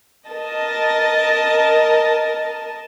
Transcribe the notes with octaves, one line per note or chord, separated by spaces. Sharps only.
A#4 D#5 A5